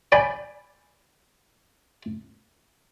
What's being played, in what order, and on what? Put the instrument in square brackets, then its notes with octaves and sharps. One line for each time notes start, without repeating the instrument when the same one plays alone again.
[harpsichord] D5 G5 G#5 B5